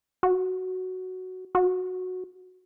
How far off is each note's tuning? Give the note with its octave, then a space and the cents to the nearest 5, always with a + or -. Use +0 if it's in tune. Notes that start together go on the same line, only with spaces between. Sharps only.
F#4 +5
F#4 -10